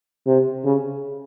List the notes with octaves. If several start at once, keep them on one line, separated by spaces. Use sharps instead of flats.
C3
C#3